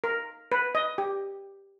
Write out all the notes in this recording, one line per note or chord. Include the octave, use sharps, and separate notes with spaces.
A#4
B4
D#5
G4